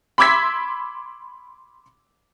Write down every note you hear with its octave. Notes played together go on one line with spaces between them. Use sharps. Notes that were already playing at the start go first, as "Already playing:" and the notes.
B5 C6 D6 E6 G#6 B6